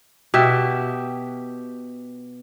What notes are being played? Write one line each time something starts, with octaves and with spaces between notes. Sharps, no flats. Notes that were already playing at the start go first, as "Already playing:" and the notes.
B2 G4 E5